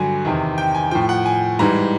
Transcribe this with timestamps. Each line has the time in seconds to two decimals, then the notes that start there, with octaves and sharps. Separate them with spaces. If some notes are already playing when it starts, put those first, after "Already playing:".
Already playing: G2 D3 F#3 G#5
0.25 E2 C3 D#3
0.58 G5
0.75 G#5
0.91 A2 F3 G5
1.09 F#5
1.26 G#5
1.59 G#2 E3 G3 A#5